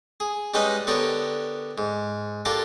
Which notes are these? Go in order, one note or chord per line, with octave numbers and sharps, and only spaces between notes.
G#4
G3 G#3 C#4 D#4 B4 D#5
D3 B3 G4 A#4 C#5 D5
G#2
D4 F4 G4 A4 A#4